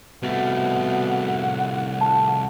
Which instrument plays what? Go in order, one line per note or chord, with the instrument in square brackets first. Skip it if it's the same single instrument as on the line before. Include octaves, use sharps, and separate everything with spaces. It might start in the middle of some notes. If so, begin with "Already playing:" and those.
[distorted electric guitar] C2 A3 [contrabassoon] B2 [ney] F#5
[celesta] A5